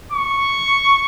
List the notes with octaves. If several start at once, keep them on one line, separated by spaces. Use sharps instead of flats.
C#6